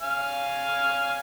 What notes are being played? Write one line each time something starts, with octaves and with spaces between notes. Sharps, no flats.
F5 G#5